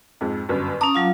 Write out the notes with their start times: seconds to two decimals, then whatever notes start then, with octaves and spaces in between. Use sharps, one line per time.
0.21 F2 G#2
0.49 G1 F#2
0.81 C#4 A5 A#5 D6 D#6
0.95 F#3 F4 F5